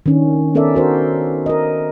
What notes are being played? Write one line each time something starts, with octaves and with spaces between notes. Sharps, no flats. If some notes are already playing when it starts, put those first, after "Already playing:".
D#3 C#4 D4
B3 C#4 A4 A#4 D5 E5
F#4 A#4 C5
A#4 D#5